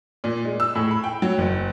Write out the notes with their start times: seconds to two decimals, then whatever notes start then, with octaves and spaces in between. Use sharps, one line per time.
0.24 A#2
0.45 G#3
0.60 E6
0.75 A2
0.91 B5
1.04 G5
1.22 F#3
1.38 F#1